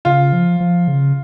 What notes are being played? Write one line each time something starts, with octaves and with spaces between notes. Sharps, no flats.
C#3 F4
F3
F3
C#3